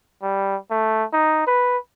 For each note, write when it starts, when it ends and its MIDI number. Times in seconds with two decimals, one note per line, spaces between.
0.22 0.56 55
0.71 1.04 57
1.13 1.43 63
1.47 1.77 71